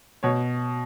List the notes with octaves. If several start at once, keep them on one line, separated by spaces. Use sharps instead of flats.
B2 C#5